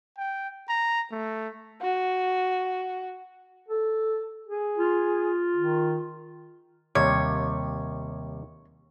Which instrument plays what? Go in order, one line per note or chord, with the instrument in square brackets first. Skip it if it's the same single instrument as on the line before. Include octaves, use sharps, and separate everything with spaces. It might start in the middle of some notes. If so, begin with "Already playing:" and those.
[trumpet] G5
A#5
A3
[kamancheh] F#4
[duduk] A4
G#4
[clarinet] F4
[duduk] D#3
[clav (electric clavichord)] D#2 C3 G3 [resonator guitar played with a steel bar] C#5